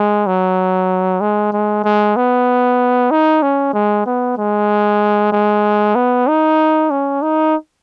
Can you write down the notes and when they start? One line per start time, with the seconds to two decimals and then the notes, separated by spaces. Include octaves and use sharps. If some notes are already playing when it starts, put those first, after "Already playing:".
Already playing: G#3
0.27 F#3
1.21 G#3
1.53 G#3
1.84 G#3
2.16 B3
3.11 D#4
3.42 C#4
3.73 G#3
4.06 B3
4.37 G#3
5.32 G#3
5.95 B3
6.27 D#4
6.91 C#4
7.22 D#4